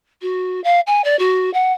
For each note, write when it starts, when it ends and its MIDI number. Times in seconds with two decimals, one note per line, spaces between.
0.21 0.62 66
0.64 0.80 77
0.87 1.01 80
1.04 1.18 74
1.19 1.52 66
1.53 1.72 78